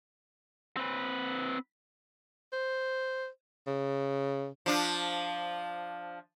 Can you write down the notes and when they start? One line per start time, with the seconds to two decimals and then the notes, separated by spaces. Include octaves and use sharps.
0.77 C4 B4
2.53 C5
3.67 C#3
4.66 F3 D4